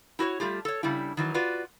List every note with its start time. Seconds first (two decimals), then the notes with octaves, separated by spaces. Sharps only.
0.19 E4 F#4 A#4 C#5
0.40 G3 A3 F4 G4
0.65 A4 C#5
0.83 C#3 G3 D4 E4
1.17 D#3 E3 F#3
1.34 F4 F#4 B4 D5